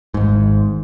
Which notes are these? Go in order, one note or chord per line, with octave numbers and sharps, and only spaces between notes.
G#1 G#2